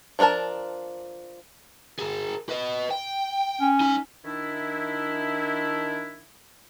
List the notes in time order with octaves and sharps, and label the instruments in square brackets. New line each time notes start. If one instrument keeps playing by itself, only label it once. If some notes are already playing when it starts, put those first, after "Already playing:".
[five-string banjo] F3 A3 D4 A#4 A5
[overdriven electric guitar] G#4 A#4
B4 D#5
G5
[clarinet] C#4
[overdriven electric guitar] D#4 G#5
[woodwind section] D#3 D4 E4